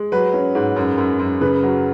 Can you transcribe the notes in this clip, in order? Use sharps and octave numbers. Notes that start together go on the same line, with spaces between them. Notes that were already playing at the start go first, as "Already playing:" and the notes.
Already playing: G#3
F#3 B4
C#4
G#2
F#2
F#2
F#2
C#3 B4
F#3